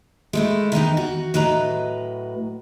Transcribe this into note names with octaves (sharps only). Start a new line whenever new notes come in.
G#3 A3 E4
D#3 E3 B3 D#4
F#4
A2 F#3 B4 D#5 A#5